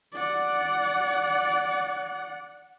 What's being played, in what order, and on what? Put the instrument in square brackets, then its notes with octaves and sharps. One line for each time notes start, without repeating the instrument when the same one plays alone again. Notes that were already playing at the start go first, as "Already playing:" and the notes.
[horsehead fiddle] D5 F#5